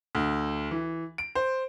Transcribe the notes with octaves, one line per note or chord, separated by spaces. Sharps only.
D2
E3
D7
C5